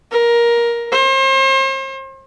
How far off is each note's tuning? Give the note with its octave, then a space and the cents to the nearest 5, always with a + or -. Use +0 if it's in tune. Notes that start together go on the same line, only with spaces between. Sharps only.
A#4 +15
C5 +40